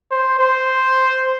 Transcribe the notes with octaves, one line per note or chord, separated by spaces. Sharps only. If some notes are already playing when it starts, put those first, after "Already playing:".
C5
C5